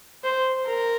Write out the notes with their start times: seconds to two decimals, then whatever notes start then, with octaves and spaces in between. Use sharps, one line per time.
0.24 C5
0.67 A#4